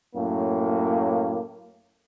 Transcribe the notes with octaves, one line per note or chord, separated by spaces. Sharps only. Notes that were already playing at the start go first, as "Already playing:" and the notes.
F#2 A2 A#3